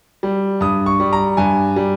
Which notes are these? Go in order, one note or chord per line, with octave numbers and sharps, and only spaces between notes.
G3
G2 D#6
C#6
G3
A#5
G2 G#5
G3